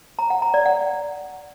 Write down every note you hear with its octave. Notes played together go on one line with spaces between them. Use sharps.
A#5
F#5
A#5
D5
F#5